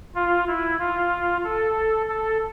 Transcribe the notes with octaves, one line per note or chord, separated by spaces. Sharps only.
F4
E4
F4
A4
A4